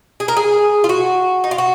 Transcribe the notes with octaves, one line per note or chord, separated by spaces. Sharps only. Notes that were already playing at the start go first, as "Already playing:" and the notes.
G#4
A#4
G#4
F4
F#4
D#4
F4
F#4